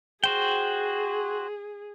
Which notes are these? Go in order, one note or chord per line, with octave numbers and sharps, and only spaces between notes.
F#4 G#4 C5 G5